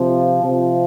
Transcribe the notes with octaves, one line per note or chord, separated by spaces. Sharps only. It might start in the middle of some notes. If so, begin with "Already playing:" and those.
Already playing: C3 F3
C3 F3